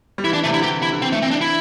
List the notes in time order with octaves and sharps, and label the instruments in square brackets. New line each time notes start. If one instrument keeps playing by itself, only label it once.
[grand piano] G3
[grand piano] E3 [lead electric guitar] E4
[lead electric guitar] D4
[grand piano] C3 [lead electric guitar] A3
[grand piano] D3 [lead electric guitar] E4
[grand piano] E3 [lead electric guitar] G4
[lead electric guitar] E4
[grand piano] D3
[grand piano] E3 [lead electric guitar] C4
[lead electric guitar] A3
C4
D4
E4